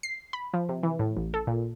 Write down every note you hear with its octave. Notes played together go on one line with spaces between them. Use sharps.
C7
B5
F3
C3
E3
A2
A1
A4
A#2